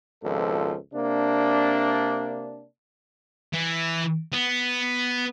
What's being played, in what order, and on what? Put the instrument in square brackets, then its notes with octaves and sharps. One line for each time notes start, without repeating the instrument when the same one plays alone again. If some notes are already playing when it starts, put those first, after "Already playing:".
[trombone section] G#1 C#2 B2 F3 A4
C3 A#3 D4
[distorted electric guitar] E3
B3